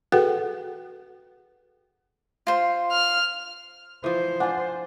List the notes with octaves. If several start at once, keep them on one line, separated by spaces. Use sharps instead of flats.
F#4 G#4 A4 B4 F#5 G5
F4 C5
F6
E3 F3 C5
D4 F4 F#5 G#5